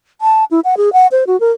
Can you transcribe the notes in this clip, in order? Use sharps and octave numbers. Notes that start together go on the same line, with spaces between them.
A5
E4
F#5
G#4
F#5
C5
F#4
A#4